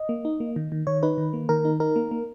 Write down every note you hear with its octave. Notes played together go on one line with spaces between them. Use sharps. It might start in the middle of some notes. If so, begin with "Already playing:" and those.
Already playing: D#5
A#3
D#4
A#3
D#3
D#3
D#3 C#5
D#4 B4
D#3
A#3
D#3 A#4
D#4
D#4 A#4
A#3
A#3